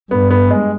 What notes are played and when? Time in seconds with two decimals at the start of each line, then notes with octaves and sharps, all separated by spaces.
0.11 G2 B3
0.31 B3
0.51 G#3